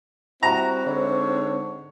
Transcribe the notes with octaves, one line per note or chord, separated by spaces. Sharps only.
G3 C4 E4 F#4 A#5
G#2 D3 C#5